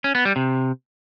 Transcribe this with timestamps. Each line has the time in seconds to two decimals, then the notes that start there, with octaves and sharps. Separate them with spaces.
0.04 C#4
0.15 B3
0.25 G3
0.36 C3